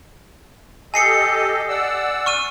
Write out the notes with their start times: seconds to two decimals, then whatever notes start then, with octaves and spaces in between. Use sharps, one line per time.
0.94 G4 A4 D#5 G#5 C7 C#7
1.69 D5 F#5 E6
2.26 C#6 F6 D#7